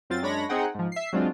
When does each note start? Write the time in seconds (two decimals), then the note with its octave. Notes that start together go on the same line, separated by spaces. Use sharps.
0.10 F#2 C4 F4 A6
0.22 F#2 G#3 D4 C#5 B5 A#6
0.49 C4 D#4 G#4 F#5 G5
0.75 G#2 F3
0.92 E5 C7
1.13 F#3 G#3 C4 D4 F4